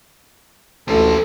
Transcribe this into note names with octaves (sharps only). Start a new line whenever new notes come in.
A1 D2 A#3 A4 C5